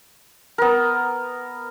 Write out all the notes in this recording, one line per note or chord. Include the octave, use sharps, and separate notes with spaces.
B3 A#4